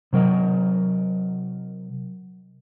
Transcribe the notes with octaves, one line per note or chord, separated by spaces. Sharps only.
C3 F#3 A#4 D#5